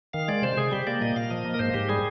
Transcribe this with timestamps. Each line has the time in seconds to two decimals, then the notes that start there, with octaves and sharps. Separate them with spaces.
0.13 D#3 F5
0.28 G#3 D5
0.42 C3 C5
0.57 C3 G#4
0.71 G3 G4
0.87 A#3 D5
1.01 A#2 D#5
1.16 A#2 F5
1.30 F3 D#5
1.45 A#3
1.54 A#4
1.59 G#2 C5
1.74 G#2 G4
1.89 G3 G#4